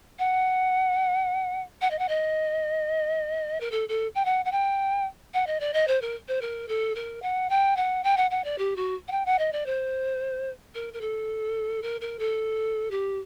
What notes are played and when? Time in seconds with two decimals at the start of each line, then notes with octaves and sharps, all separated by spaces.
0.19 F#5
1.81 F#5
1.91 D#5
1.99 F#5
2.09 D#5
3.60 A#4
3.72 A4
3.89 A4
4.15 G5
4.25 F#5
4.45 F#5
4.52 G5
5.34 F#5
5.47 D#5
5.60 D5
5.73 D#5
5.87 C5
6.01 A#4
6.28 C5
6.41 A#4
6.68 A4
6.95 A#4
7.22 F#5
7.50 G5
7.76 F#5
8.04 G5
8.17 F#5
8.31 F#5
8.44 D5
8.58 G4
8.76 F#4
9.08 F#5
9.11 G5
9.26 F#5
9.39 D#5
9.52 D5
9.66 C5
10.75 A#4
10.93 A#4
11.01 A4
11.82 A#4
12.01 A#4
12.19 A4
12.91 G4